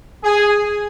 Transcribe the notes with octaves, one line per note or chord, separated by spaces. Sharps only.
G#4